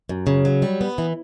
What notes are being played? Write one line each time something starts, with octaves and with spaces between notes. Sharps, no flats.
F#2
C#3
F#3
G3
B3
E3